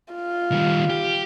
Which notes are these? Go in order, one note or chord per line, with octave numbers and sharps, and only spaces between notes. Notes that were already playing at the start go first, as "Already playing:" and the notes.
F4
D#3 G3
G4